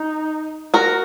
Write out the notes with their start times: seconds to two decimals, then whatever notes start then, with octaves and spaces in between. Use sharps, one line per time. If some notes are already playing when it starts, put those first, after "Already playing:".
Already playing: D#4
0.74 F#4 A#4